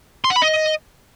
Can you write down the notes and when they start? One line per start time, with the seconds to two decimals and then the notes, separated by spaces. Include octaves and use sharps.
0.24 C6
0.30 F#5
0.36 B5
0.42 D#5